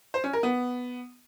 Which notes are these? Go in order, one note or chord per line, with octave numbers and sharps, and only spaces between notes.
C5
C#4
A#4
B3